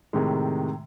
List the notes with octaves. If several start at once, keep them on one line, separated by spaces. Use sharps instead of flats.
A2 C3 D#3 G#3